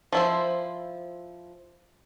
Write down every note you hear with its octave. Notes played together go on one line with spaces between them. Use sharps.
F3 E4 C5